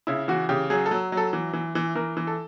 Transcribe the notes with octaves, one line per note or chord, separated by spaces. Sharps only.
C#3 E4
E3 F#4
C#3 G4
F#3 G#4
A4
F#3
F#3
A4
E3
E3
E3
E3 A#4
E3
A4